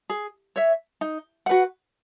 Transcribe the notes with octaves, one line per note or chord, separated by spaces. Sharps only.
G#4
C#5 E5
D#4
F#4 B4 F#5